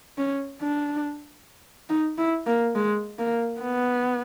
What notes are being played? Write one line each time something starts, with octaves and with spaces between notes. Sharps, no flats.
C#4
D4
D#4
E4
A#3
G#3
A#3
B3